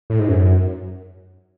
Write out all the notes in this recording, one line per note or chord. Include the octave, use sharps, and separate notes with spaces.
A2
G#2
F#2